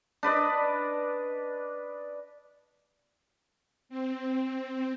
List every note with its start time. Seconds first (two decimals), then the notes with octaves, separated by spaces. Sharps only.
0.23 D4 B4 D5 D#5
3.89 C4